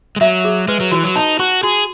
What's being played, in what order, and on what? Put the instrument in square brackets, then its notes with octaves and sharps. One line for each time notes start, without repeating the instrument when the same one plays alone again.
[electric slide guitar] G#3
[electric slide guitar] F#3 [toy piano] E5
[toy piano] G#4
[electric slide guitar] G#3 [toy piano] B4
[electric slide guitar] F#3
[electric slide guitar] E3 [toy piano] F#4
[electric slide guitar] F#3
[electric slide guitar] D#4 [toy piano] A5
[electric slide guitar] F#4 [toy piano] C#6
[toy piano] F#4 [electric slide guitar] G#4